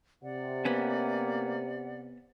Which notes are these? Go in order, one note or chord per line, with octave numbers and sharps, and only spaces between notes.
C3 D5 F#5
A#3 B3 C#4